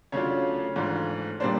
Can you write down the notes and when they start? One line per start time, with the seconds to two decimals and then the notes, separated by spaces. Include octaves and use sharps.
0.12 C#3 F#3 A3 D4 F4 C#5
0.76 G#2 E3 A3 D4 F4
1.40 A#2 G3 A#3 D4 C5